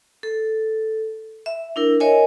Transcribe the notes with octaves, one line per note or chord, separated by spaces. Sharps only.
A4
E5
D4 E4 A#4
A#4 C#5 D#5 E5 G#5